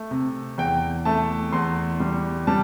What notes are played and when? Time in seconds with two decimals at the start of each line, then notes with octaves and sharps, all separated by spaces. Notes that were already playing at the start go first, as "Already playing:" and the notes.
Already playing: A3
0.11 C3
0.58 E2 G5
1.05 A3 A5
1.52 E2 C6
2.00 G3
2.47 G3 A5